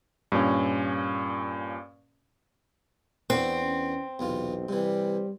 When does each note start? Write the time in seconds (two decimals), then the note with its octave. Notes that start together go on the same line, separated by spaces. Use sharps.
0.32 G2 A#2 C#4
3.30 E2 C4 D4 F#4
3.62 C#4
4.19 B1 E2 C3 F4
4.69 C3 E3 G3